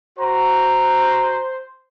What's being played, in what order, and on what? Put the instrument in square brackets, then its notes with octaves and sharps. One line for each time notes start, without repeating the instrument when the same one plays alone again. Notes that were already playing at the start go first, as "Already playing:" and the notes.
[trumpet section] F#4 A#5 [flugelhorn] C5